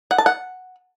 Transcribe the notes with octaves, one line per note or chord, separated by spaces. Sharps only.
F#5
A5
F#5